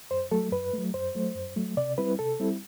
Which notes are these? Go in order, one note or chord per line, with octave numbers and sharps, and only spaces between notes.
F#2 C5
F#3 A3 A4
F#2 B4
F#3 A3
F#2 C5
F#3 A3
F#2
F#3 A3
C3 D5
G3 C4 E4 B4
C3 A4
G3 C4 E4